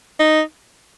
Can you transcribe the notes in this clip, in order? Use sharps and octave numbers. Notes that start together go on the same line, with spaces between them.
D#4